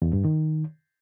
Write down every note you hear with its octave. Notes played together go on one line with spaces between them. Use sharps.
E2
G2
D#3